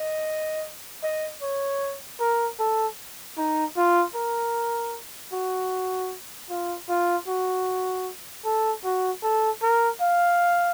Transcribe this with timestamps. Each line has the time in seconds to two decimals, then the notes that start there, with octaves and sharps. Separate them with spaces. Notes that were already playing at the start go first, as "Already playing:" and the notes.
Already playing: D#5
1.03 D#5
1.42 C#5
2.20 A#4
2.59 A4
3.38 D#4
3.77 F4
4.15 A#4
5.33 F#4
6.50 F4
6.89 F4
7.28 F#4
8.45 A4
8.84 F#4
9.23 A4
9.62 A#4
10.01 F5